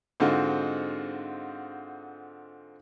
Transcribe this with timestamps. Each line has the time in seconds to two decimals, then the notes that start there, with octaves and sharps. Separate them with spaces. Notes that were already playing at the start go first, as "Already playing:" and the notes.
0.20 G#2 D3 C4 D#4 F4 F#4